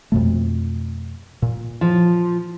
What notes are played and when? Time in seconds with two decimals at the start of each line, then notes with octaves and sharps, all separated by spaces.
0.12 F2 B2 A3
1.42 A#2
1.81 F3